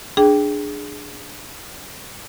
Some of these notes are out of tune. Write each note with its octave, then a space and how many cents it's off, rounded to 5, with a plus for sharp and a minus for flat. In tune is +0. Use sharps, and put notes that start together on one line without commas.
D4 +10 G#4 +0 G5 -5